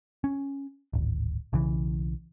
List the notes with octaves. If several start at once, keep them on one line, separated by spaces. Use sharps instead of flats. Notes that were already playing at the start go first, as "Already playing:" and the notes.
C#4
D1 G#1
B1 C#3 E3